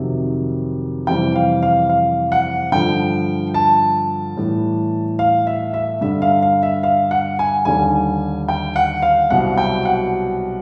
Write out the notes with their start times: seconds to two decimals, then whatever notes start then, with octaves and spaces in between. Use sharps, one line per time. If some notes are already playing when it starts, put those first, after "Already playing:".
Already playing: F2 C3 D#3 F#3
1.07 F2 C3 E3 G3 G5
1.35 F5
1.63 F5
1.89 F5
2.32 F#5
2.72 G2 D3 F3 G5
3.54 A5
4.37 A2 E3 G3
5.19 F5
5.47 E5
5.73 E5
6.01 G2 D3 G3 E5
6.22 F5
6.42 F5
6.63 E5
6.83 F5
7.11 F#5
7.39 G#5
7.65 D#2 D3 G3 G#5
8.48 G5
8.76 F#5
9.02 F5
9.30 C2 B2 F#3 F#5
9.58 G5
9.85 F#5